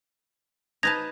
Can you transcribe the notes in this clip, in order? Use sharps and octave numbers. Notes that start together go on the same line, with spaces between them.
D#4 B4 A5 G#6 A#6 F7